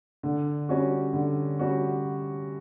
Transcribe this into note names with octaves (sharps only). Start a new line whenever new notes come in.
D3
G3 C#4 F#4
D3
G3 C#4 F#4